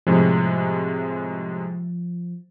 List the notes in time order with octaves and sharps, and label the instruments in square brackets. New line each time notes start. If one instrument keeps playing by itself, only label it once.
[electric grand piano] A2 C3 G#3 [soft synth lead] F3